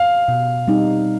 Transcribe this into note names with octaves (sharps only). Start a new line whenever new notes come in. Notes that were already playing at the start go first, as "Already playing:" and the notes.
Already playing: F5
B2
G3 C4 D#4